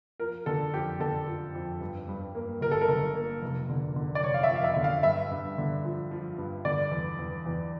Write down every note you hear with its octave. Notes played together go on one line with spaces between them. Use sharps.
F3 A#4
D3 A4
F2 G4
D3 A4
F3
F2
G2
G2
A#3
G1 A#4
A4
A#4
G1
A#3
F1
D3
D3
D5
F1 C#5
F5
E5
F2
F5
E5
D3 E5
F5
G2 E5
G2
D3
F3
F3
G2
D3 D5
E2
E2
E2